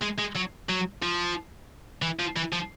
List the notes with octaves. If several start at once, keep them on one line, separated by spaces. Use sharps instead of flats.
G#3
G#3
F#3
F#3
F3
E3
F3
E3
F3